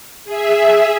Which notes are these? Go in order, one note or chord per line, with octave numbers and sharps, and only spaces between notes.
G#4 E5